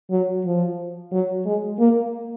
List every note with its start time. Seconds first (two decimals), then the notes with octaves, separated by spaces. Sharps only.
0.11 F#3
0.45 F3
1.12 F#3
1.45 G#3
1.79 A#3